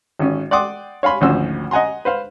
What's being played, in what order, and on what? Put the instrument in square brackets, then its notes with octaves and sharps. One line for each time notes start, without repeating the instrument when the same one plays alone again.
[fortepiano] G#1 C#4
D5 F#5 G5 C6 D6 D#6
C#5 F5 G#5 B5 C6
G#1 D2 F3 C#4 C5 E6
D#5 F#5 G#5 A#5 C6
B4 C5 F5